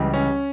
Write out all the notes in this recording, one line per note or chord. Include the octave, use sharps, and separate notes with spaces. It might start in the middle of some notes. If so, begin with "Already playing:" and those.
Already playing: C#2 C#3 E3 G3
C#4